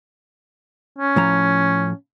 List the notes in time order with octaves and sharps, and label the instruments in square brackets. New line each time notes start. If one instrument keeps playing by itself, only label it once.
[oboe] C#4
[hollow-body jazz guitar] A2 F3 A#5